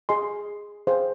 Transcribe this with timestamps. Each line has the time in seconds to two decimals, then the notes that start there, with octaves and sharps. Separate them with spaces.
0.09 G#4 D#5 G#5 C6
0.87 G#4 C5 F5